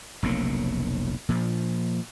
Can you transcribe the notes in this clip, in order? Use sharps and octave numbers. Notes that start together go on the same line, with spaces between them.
F1 B1 C#3 A#3
A#2 F3